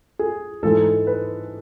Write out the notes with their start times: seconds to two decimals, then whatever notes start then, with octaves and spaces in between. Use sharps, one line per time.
0.19 G#4
0.63 G#2 E3 G#3 A4
1.07 B4